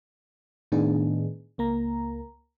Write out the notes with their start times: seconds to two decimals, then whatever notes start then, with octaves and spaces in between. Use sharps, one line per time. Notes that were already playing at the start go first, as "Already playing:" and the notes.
0.72 A2 D#3 B3 D4 D#4 G#4
1.58 C#2 A#3 A#5